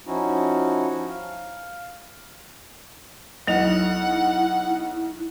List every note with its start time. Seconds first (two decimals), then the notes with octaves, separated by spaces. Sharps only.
0.07 F3 C#4 D#4 E4 F#4
1.08 F5
3.47 B1 F#3 E4 D#5 F#5 F7